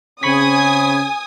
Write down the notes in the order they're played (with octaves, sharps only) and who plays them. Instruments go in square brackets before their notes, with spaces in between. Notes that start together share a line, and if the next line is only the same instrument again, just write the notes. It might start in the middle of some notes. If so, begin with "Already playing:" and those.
[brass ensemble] C#3 C4 [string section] G#5 D#6 [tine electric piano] B5 C#6 B6